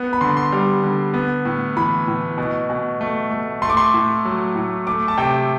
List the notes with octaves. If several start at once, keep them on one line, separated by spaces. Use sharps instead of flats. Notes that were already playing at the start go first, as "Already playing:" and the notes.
Already playing: B3
B5
D3 C6
C6
G3
D3
B3
A2
E3 B5
A2
B2
B2
A3
A3
A3 C6
D6
C6
A2
F#3
A2
A3 D6
A5
C3 G5